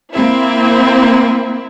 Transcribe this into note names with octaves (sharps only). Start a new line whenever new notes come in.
A#3 C4 E4